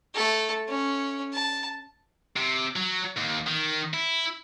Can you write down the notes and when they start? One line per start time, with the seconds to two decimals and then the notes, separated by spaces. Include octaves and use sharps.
0.14 A3 A4
0.68 C#4
1.33 A5
2.37 C3
2.76 F#3
3.17 D#2
3.47 D#3
3.94 E4